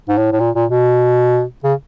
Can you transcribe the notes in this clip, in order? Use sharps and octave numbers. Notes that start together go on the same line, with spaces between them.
G#2
A2
A2
A#2
A#2
B2
C#3